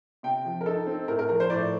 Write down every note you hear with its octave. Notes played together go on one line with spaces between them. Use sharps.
C3 G5
F3
A#4
D#4 A4
C4
A2 A#4
A#4
F3 A#4
C5
A2 D5